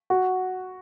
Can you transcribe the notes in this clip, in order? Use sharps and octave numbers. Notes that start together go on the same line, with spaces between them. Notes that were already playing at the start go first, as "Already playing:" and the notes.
F#4